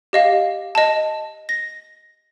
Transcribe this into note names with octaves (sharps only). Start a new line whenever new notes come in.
G4 D#5 F5
D#5 A5
A#6